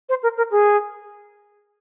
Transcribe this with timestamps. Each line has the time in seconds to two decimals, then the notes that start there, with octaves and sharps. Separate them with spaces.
0.09 C5
0.23 A#4
0.37 A#4
0.51 G#4